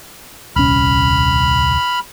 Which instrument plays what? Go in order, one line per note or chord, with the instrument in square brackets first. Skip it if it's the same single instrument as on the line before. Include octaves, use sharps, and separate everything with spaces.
[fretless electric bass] D#1 C2 C#4 [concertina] B5 F6